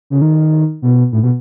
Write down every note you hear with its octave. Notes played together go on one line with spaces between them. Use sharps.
C#3
D#3
B2
A2
B2